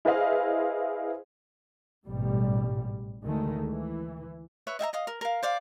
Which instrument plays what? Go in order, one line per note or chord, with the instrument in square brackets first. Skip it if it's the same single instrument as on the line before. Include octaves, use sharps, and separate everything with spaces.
[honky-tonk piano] E4 G#4 B4 C5 D#5 F5
[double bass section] A1 G#2 B2 G3
D2 D#3 G#3 A3
E3
[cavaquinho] B4 C#5 E5
D#5 E5 G5 A#5
D#5 F5 D#6
A#4
A#4 F5
C5 D5 F5